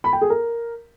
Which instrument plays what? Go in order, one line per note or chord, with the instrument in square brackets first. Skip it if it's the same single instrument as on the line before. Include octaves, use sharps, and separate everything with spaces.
[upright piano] B5
G5
G#4
A#4